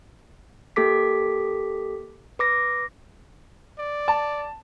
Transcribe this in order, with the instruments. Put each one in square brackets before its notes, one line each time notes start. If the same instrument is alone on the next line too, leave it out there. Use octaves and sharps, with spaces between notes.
[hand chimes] A#3 G4 A4 D6 B6
B4 D6 A#6
[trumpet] D5
[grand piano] A5